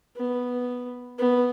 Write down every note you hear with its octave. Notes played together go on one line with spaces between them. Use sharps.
B3
B3